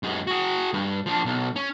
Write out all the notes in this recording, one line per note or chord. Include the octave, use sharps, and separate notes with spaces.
F#2 G#3
F#4 G#4
G2
F3 D4
B1
C#4